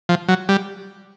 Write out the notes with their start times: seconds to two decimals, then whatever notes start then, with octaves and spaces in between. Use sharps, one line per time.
0.09 F3
0.28 F#3
0.49 G3